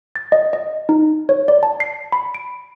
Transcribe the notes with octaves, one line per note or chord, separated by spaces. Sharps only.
A6
D#5
D#5
D#4
C#5
D5
A5
C7
B5
D7